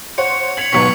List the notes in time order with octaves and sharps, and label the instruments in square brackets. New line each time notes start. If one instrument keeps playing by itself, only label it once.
[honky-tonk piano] C5 C#5 F#5 [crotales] C#7
[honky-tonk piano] G#6 B6 [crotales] C#7 F7 F#7
[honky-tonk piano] D#2 G#2 F#3 [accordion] B2 [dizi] C#6 [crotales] B6